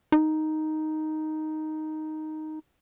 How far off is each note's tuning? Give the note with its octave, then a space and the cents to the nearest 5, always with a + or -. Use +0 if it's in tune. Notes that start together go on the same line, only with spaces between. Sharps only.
D#4 +0